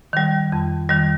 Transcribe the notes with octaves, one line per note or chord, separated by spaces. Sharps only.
D#3 G3
F2
D#3 G3